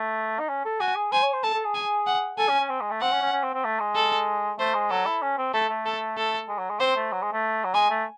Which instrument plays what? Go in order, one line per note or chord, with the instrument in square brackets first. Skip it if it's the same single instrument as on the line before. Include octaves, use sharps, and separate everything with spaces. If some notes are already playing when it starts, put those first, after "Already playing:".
Already playing: [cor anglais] A3
D#4
C#4
A4
[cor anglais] F#4 [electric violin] G#5
[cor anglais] G#4
[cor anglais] C5 [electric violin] G#5
[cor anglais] C#5
C5
[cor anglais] A4 [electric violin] A5
[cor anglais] A4
G#4
[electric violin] G#5
F#5
[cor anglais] A4 [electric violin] G#5
[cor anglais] C#4
C#4
C4
G#3
A3
[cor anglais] C4 [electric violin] F#5
[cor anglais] C#4
C#4
C#4
C4
C4
A3
G#3
[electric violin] A4
[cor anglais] A3 [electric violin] C5
[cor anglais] G#3
[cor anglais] F#3 [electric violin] A4
[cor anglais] E4
C#4
C4
[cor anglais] A3 [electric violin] A4
[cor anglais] A3
[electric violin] A4
A4
[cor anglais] G#3
F#3
G#3
[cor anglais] C4 [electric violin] C5
[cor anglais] A3
F#3
G#3
A3
F#3
[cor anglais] G#3 [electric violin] G#5
[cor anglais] A3